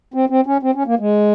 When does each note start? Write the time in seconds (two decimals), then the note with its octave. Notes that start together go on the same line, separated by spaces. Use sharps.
0.14 C4
0.29 C4
0.46 C#4
0.63 C4
0.75 C#4
0.86 A#3
0.99 G#3